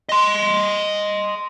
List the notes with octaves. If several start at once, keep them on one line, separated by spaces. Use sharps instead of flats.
D#5 C6